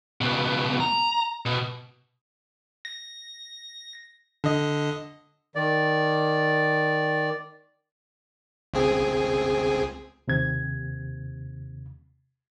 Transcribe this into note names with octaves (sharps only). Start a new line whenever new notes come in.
C#2 B2
A#5
B2
A#6
D3 D#5
D#3 D5
C#2 C4 G#4
D#2 C3 G#6